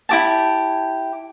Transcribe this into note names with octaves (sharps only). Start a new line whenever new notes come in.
E4 G4 A5